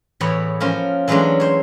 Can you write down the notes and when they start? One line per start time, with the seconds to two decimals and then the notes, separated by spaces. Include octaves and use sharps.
0.20 E2 A2 E3 B3 C#5
0.60 F3 A#3 C#4 F4
1.08 E3 F#3 G#3 A3 C#4 D4
1.40 C5 C#5